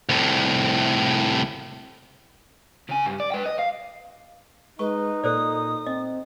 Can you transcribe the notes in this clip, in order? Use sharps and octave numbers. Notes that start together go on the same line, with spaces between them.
C2 A2
C#3 G#5
G2
D5
B4 G5
D#5
F5
G#3 D#4 B4 C#6
A#2 A4 C5 D5 D#6
C4 D#5